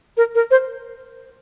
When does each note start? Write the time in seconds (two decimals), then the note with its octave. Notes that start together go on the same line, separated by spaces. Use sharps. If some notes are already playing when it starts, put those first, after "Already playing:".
0.17 A#4
0.35 A#4
0.51 C5